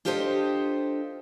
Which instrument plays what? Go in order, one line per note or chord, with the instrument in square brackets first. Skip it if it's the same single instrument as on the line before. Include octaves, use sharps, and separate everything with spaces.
[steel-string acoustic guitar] D4 F4 G4 A4 C5 D#5